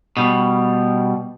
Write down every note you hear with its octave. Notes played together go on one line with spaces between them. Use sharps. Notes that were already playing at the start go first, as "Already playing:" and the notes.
B2 G3